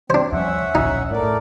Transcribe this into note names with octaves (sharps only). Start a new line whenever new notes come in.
C4 D4 C5
D#2 F3 G3 C#4 E5 F#5
D1 A#1 D#4
A2 A3 A#4 D5
A2